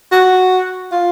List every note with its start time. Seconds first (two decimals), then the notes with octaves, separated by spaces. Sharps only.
0.12 F#4
0.92 F4